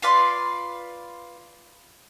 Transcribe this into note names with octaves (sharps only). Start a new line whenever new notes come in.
F4 B4 D5 C6